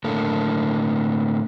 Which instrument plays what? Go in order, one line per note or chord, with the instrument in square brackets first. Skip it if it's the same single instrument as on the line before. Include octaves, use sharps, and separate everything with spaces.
[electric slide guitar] A2 D3 A#3 A4